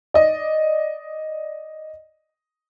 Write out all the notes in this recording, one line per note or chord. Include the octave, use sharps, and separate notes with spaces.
D5 D#5